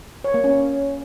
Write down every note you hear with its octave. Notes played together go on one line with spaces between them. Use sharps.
C#5
A#3
C#4